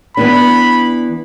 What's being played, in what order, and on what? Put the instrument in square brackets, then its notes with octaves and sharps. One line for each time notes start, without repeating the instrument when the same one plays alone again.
[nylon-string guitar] E3 B3 D4 [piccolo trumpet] B5